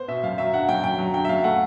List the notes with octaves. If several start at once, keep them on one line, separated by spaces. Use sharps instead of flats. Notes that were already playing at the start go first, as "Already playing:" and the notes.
Already playing: B3 C5
B2 E5
F#2 F5
F#3 E5
D3 F#5
F#2 G5
F#2 G5
F#3
D3 G5
E5
F#2 F5
A3 F#5